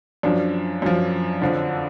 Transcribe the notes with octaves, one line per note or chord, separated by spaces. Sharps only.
F#2 F3 D4
F#2 F3
F2 D3 F3